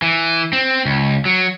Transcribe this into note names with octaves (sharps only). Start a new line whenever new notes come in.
E3
C4
C#2
F#3